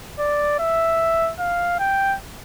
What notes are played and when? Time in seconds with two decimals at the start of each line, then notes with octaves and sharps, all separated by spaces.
0.19 D5
0.59 E5
1.39 F5
1.79 G5